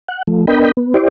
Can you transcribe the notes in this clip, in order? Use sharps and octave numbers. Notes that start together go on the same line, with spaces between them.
F#5
F3 A3
B3 D4 A#4 D#5 G5 B5
B3
E4 G4 C5 D5